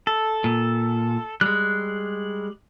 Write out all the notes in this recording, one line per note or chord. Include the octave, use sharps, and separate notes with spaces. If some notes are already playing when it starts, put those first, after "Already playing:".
A4
A#2
G3 G#3 F#6